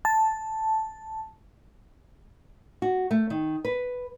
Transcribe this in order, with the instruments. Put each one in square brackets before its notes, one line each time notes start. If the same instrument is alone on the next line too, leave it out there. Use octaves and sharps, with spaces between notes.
[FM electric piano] A5
[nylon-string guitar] F#4
A3
D#3
B4